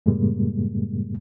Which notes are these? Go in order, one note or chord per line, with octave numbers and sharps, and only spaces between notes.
F#2 A2 C#3 G3 G#3 A#3